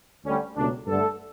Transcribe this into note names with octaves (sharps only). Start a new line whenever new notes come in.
D2 D3 G3 C#4
C#2 B2 F#3 A3 D4
G2 D3 A3 A4